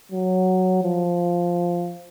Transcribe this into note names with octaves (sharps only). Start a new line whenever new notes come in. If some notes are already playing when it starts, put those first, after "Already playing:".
F#3
F3